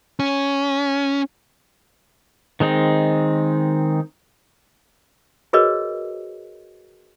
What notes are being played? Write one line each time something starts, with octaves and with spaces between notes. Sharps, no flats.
C#4
D#3 G#3 C4 D#4
F#4 G#4 A#4 B4 C#5 D#5